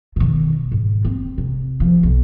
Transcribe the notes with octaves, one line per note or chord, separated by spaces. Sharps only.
B2 D#3
G#2
C4
C3
F3
B1